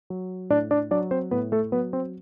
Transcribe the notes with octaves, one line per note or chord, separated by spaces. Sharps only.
F#3
A2 D4 D5
D4 D5
F#3 D4 D5
C4 C5
A2 B3 B4
A3 A4
F#3 B3 B4
C4 C5